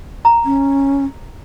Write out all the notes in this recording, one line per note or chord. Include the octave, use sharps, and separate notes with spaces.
A#5
C#4